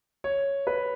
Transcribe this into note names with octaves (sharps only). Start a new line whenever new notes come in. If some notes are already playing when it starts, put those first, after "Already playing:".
C#5
B4